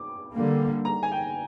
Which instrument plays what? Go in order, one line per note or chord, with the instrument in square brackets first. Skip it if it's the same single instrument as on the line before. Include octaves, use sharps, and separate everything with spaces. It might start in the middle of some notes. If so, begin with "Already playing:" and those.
Already playing: [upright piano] D6
[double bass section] D3 G3 A#3
[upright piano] A#5
G#5
G5